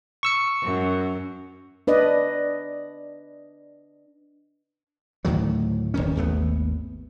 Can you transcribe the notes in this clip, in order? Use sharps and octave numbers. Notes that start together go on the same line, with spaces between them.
C#6 E6 C#7
F#2
D4 B4 D5 D#5
D2 A2 D#3 F#3
D1 G#1 D#3 C#4
G#1 D#2 A3 B3